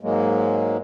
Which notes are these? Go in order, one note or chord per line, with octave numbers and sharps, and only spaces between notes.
G#2 F#3 G#3 A#3